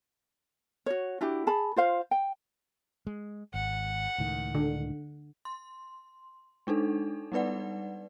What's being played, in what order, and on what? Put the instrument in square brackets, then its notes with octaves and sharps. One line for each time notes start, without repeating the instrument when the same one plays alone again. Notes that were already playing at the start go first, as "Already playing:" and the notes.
[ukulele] F#4 C#5
D4 E4 F#4 G4
G#4 A5 B5
F4 C5 F5
G5
[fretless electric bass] G#3
[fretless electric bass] G#1 [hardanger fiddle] F#5
[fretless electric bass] C#2 A2 D#3
[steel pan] D3
[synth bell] C6
G#3 D4 D#4 A4
G3 B3 D#4 B4 D5 F#5